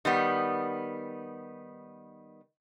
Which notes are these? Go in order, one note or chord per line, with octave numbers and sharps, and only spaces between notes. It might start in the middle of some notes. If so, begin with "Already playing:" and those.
D#3 G3 B3